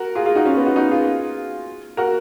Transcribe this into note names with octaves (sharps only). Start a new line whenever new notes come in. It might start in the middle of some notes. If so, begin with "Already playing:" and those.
Already playing: F#4 A#4
F4 G#4
F4 G#4
D#4 F#4
C#4 F4
B3
D#4 F#4
D#4 F#4
F4 G#4
F#4 A#4